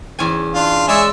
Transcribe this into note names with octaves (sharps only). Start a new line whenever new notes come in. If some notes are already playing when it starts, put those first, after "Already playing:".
E2 C#4 G#5
D4 F4
G#3 G#4 C#5 D5 E5 E6